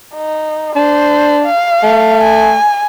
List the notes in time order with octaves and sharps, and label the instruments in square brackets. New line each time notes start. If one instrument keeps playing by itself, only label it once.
[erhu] D#4
[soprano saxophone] D4 [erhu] C5
[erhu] F5
[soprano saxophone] A3
[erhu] G#5